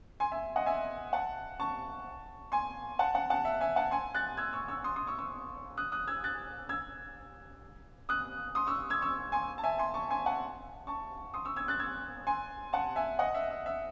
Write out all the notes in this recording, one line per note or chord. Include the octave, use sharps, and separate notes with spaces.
G#5 C6
E5 G#5
D#5 F#5
E5 G#5
F#5 A5
A5 C#6
G#5 C6
F#5 A5
F#5 A5
F#5 A5
E5
E5 G#5
F#5 A5
G#5 C6
F#6 A6
E6 G#6
C#6 E6
C#6 E6
C6 D#6
C6 D#6
C#6 E6
C#6 E6
D#6 F#6
D#6 F#6
E6 G#6
F#6 A6
E6 G#6
D#6 F#6
C6 D#6
C#6 E6
E6 G#6
C#6 E6
G#5 C6
A5
E5 G#5
G#5 C6
A5 C#6
G#5 C6
F#5 A5
A5 C#6
C6 D#6
C#6 E6
E6 G#6
F#6 A6
E6 G#6
G#5 C6
F#5 A5
E5 G#5
D#5 F#5
E5
E5
E5